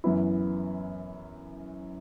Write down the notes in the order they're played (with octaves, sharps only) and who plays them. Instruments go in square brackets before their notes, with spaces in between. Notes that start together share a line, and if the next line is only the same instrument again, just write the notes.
[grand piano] F#2 E3 B3 E4